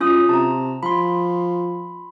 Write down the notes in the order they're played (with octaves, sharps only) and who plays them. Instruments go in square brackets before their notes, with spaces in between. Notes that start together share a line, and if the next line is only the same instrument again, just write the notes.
[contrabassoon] F#2 [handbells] C#4 F4 D#6
[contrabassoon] C3 [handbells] A5 A#5
[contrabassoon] F3 [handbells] B5 C6